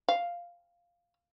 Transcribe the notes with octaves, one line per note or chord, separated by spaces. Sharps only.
F5